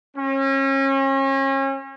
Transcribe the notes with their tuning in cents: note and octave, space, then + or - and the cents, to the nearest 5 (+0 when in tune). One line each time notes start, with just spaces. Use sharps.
C#4 -35